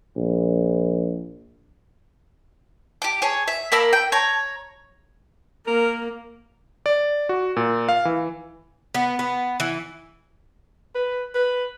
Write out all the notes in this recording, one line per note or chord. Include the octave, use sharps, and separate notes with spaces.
A#1
G4 D6
G#4 C#5
E5
A#3 A#4 B5 E6
G5
C#5 A#5
A#3 A#4
D5
F#4
A#2
F5
E3
B3
B3
E3
B4
B4